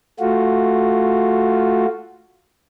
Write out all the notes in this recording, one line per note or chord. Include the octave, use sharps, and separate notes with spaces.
A3 F4 F#4